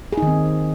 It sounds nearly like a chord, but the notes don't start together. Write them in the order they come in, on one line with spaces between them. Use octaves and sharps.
G#4 D#4 D#3 C4